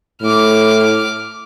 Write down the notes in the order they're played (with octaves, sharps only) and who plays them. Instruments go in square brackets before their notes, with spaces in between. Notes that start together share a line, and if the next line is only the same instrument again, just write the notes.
[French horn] A2 [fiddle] D6 F6